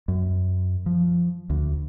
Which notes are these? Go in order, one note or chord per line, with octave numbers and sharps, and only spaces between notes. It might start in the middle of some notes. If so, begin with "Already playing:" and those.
F#2
F3
D2